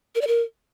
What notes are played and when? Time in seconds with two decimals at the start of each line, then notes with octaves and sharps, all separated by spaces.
0.15 A#4
0.21 D5
0.27 A#4